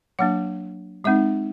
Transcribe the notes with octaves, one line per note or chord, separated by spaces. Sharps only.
F#3 A#3 D4 F#5
G#3 C4 D#4 E5